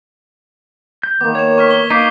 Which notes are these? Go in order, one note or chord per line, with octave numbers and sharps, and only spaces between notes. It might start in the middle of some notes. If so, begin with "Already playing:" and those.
G6
D#3 A#3 B3 D6
C#5 G#6 E7
C#6 F6 B6
G7
A#3 D#4 D6 G6 B6 C7